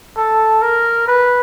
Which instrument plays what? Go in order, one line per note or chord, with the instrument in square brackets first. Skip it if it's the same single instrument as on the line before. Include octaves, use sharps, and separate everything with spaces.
[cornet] A4
A#4
B4